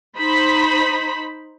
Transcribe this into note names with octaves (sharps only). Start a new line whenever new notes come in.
D#4 C5 B5